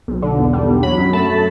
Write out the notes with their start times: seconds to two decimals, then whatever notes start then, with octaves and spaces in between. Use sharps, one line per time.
0.08 B1
0.22 D3
0.38 E2
0.53 G3
0.67 E2
0.83 F#3 B5
0.98 F#2
1.13 A3 A5